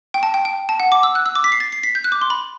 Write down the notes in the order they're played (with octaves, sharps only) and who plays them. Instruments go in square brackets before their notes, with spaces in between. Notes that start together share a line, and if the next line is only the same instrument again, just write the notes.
[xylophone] G5
A5
G5
G5
A5
F#5
D6
E6
F#6
E6
D6
B6
C7
A6
C7
B6
G6
F#6
D6
C6
B5